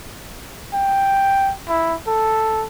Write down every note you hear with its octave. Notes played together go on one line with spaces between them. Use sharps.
G5
E4
A4